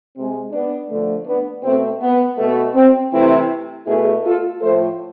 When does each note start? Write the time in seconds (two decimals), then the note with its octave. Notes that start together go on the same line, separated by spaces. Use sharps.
0.14 C3 G#3 C4
0.51 B3 D4
0.89 D3 F3 A3
1.25 B3 D4
1.63 B2 A3 C4
2.00 B3
2.37 B2 A3
2.74 C4
3.12 C3 E3 A3 C4 E4
3.86 B2 A3 E4 G#4
4.24 F4 A4
4.60 A2 F3 A3 A4 C5